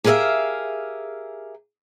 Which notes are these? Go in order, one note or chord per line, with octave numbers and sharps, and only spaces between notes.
G4 G#4 A#4 C#5 E5 F5